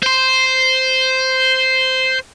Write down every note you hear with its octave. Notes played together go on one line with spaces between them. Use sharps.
C5 C6